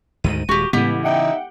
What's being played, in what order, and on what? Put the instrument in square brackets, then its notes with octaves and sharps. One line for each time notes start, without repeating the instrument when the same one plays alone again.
[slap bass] D2 G#2 D#3 [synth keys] D#7
[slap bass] D#1 G#3 [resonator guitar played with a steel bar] F#4 G4
[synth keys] A2 G#3 B3 [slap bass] C#3 E3 [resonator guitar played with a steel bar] G4
[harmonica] D#4 E5 [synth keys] F#5 G5